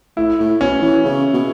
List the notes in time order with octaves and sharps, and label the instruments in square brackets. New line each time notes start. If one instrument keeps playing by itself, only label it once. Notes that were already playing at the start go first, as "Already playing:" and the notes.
[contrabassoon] A2 [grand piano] E4
[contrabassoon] A2
[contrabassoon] B2 [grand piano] C#4
[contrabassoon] E3
C#3
B2